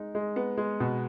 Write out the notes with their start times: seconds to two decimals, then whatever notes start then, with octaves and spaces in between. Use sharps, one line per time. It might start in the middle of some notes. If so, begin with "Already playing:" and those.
Already playing: G#3 D#4
0.15 G#3
0.36 B3
0.58 G#3
0.80 B2